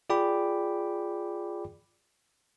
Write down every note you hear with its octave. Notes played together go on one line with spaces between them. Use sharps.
F4 G#4 D5 G5 B5 D6